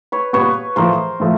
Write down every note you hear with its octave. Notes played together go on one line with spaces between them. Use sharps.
B4 C#5
A#2 G3 B3 B4 C#5
A2 F3 A3 A#4 C5
A2 F3 A3